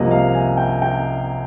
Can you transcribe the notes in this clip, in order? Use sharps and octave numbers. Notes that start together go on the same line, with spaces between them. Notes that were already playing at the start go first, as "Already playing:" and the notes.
Already playing: C2 C3 F3 A#3 D#5
F5
G#5
G5
G5